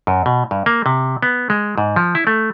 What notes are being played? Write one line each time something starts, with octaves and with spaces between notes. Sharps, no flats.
F#2
B2
G2
A#3
C3
B3
G#3
G#2
F3
E4
A3